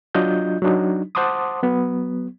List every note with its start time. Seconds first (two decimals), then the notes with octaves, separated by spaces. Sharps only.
0.15 F#3 D4 F4 D#5 G6
0.62 F#3 D4 D#4
1.15 C5 F#5 A5 C6 D6 D#6
1.63 F#3 B3